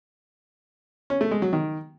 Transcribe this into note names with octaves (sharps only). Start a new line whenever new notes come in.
C#4
A3
G#3
F#3
D#3